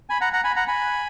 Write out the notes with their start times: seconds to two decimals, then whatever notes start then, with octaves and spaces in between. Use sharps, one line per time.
0.10 G#5 B5
0.21 F#5 A#5
0.33 F#5 A#5
0.44 G#5 B5
0.56 F#5 A#5
0.68 G#5 B5